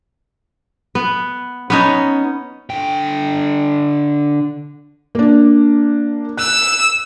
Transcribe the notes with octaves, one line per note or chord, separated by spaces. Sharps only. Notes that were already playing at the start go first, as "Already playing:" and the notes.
B3
B3 C#4 D#4
D3 G5
A#3 D4
E6 F#6